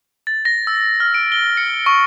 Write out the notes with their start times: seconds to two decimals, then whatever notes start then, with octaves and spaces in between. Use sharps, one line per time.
0.27 A6
0.45 A#6
0.67 E6
1.00 F6
1.14 D7
1.32 G7
1.57 C#7
1.86 C#6